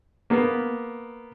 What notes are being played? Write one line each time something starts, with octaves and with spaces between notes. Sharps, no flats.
A#3 B3